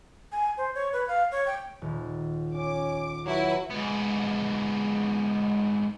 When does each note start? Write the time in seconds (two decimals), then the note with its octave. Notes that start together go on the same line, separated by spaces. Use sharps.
0.32 G#5
0.58 C5
0.75 C#5
0.93 B4
1.08 F5
1.32 C#5
1.47 G5
1.82 D#1
2.54 C#4 D6
3.26 F#3 E4 F#4 B4
3.71 G#2 B3